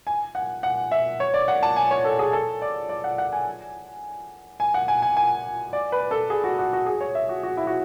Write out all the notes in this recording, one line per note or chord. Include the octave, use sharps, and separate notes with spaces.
G#5
F#5
F#5
E5
C#5
D5
F#5
A5
G#5
C#5
A4
G#4
A4
D5
D5
F#5
F#5
G#5
G#5
F#5
G#5
G#5
G#5
D5
B4
A4
G#4
F#4
F#4
F#4
G#4
C#5
E5
F#4
F#4
E4
F#4